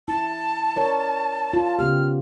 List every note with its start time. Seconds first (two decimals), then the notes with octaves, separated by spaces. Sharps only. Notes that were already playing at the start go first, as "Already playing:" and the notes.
0.08 E4 A5
0.76 A#4 C#5 D5
1.53 F4
1.79 C#3 B3 G4 F6